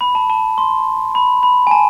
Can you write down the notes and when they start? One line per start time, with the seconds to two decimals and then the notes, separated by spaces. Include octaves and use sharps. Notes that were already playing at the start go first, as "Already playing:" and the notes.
0.01 B5
0.15 A5
0.30 A5
0.58 C6
1.15 B5
1.43 B5
1.67 G#5
1.71 A5